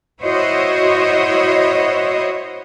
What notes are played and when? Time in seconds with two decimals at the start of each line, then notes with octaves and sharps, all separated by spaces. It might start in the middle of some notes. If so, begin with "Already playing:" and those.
0.21 E4 F#4 C5 C#5 D#5